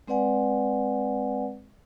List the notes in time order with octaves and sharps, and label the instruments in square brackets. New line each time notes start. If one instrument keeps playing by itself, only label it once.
[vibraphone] G#3 C4 B4 D5 F#5 G#5